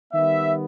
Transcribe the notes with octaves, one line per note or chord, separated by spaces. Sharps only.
D#3 G3 B3 E5